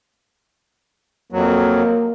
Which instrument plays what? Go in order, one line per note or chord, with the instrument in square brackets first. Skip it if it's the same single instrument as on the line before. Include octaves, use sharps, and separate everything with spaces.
[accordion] F2 F#3 [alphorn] A#3